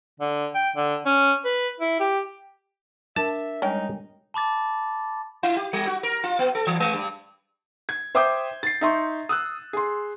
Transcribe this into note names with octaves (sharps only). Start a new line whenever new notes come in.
D3
G5
D3
C#4
B4
E4
G4
D4 A#4 E5 A5
G3 G#3 C#4 D#4 G5
A5 B5 D6 A6
E4
G4
G3
F#4
A#4
F4
B3
A4
E3
G#3
G2
G#6
C5 E5 G5 D6 D#6 G6
A6 C7
D#4 E5 C6 C#6
D#6 E6 F#6
G#4 C6